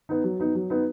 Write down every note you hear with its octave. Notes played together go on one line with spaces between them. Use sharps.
B3 D#4
F#3
B3 D#4
F#3
B3 D#4